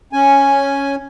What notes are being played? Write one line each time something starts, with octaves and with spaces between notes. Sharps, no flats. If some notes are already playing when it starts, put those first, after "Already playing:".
C#4 G#5